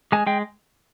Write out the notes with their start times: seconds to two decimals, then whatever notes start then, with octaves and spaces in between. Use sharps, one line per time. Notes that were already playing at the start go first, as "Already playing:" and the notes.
0.12 G#3 G#5
0.27 G#3 G5